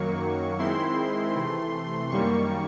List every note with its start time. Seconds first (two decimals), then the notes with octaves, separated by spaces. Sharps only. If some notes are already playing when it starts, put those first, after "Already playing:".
Already playing: F#2 D#3 F#3 A#3 C#6
0.59 D#3 G#3 C4 E4 C6
1.35 C3 E3 A3
2.10 F#2 D#3 G3 A#3 C#6